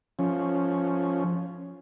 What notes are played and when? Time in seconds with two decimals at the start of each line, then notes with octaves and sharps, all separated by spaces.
0.19 F3 C#4